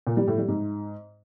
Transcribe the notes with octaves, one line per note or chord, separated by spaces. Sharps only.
A#2
G3
A2
G3
G#2